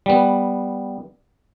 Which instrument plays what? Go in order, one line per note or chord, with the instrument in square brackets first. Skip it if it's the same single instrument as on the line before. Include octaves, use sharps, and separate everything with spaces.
[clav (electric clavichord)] G3 B3